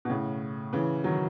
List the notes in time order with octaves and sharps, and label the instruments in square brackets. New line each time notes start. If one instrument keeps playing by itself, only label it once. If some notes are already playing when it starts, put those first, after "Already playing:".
[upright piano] B2
A2 C#3
C#3 E3
D#3 F#3